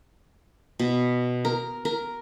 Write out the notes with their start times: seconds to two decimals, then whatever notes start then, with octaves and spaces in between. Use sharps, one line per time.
0.79 B2
1.45 A#4
1.85 A#4